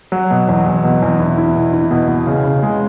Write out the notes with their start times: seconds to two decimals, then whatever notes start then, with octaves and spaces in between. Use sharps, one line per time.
0.12 F#3
0.31 B2
0.48 E2
0.66 E2
0.84 B2
1.02 E2
1.19 E4
1.38 E4
1.55 B2
1.73 E4
1.91 B2
2.08 B2
2.27 C#3
2.44 C#3
2.63 G#3